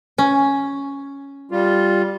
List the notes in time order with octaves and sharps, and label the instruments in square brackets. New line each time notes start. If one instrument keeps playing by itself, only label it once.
[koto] C#4
[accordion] G3 F4